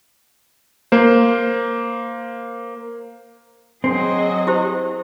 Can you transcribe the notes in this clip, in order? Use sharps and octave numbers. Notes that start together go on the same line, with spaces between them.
A#3 C5
F#3 C4 G#4 D#5
E4 G4 C5